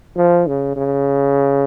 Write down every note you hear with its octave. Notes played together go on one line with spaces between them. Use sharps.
F3
C#3
C#3